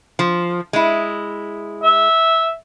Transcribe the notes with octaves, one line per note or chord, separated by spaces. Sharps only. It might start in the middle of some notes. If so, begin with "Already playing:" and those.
F3
G#3 E4
E5